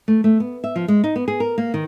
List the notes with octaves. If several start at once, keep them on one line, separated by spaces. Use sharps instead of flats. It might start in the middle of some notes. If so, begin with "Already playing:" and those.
A3
A3
B3
E5
F3
G#3
D#4
B3
G#4
A#4
A#3
D#3